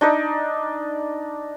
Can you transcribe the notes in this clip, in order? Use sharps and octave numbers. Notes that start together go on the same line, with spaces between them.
D4 D#4 D5